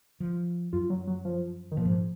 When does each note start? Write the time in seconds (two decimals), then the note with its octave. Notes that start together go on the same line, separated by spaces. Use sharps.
0.20 F3
0.73 F#2 F4
0.90 F#3
1.07 F#3
1.25 F3
1.72 D#3
1.77 A#2 F3
1.85 G#2